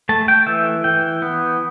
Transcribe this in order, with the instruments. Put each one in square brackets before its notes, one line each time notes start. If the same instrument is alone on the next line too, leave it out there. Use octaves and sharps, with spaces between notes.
[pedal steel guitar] A3 A5
G5
E3 E5
E3 G5
B3